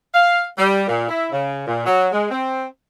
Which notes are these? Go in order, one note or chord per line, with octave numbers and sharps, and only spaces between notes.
F5
G3
A#2
E4
C#3
A#2
F#3
G#3
C4